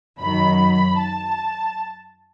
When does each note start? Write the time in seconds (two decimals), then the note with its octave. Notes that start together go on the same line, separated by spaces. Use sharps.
0.20 F#2 D#3 F#3 B5
0.99 A5